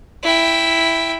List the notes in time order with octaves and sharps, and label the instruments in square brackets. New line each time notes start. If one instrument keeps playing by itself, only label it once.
[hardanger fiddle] E4 G5